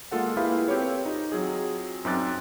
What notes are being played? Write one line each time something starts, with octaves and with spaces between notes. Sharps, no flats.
G#3 A#3 F4 A4 F#5
A#3 E4 G4 G#4 B4 F5
C4 G4 A4 B4 C#5
D#4 F4
F#3 C4 F4 G#4
F#2 C4 D#4 D6 F#6 A6